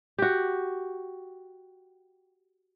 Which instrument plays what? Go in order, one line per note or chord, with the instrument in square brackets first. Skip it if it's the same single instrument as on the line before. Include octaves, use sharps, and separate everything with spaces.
[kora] F#4 G4